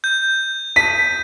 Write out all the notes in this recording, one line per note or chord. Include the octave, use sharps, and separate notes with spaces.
G6
B6 D#7